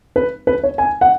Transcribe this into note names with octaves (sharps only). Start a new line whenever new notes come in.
B4
B4
C#5
G#5
F#5